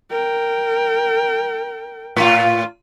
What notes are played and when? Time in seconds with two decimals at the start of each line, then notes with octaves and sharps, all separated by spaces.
0.10 A#4 G5
2.16 A2 F4